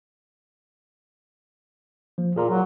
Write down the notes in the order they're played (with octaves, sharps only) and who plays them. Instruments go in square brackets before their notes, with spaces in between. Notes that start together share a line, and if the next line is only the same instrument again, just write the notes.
[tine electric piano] F3 A#3
[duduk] A#2 [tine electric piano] G#4 A#4 A#5
[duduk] F#3